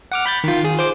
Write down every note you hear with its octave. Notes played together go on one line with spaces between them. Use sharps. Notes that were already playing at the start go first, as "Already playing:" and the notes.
F#5 D6 F6
B5 G6 A6
D#3 F4
G#4
C5 D6